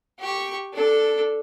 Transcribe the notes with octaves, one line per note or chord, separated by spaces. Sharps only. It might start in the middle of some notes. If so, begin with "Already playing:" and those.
G4 C#6
D4 A4